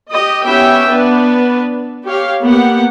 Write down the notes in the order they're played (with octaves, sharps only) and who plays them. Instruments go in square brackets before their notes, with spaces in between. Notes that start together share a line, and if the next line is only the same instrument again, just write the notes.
[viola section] G4 D#5
B3 C#4 E4 G4 E5 G5
B3 D4 B4
G4 C#5 F5
A#3 B3 G4 F#5